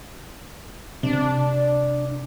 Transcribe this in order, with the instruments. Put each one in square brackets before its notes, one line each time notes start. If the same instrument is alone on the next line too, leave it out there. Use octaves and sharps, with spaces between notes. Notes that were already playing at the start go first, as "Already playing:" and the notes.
[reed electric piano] C3 [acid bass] D4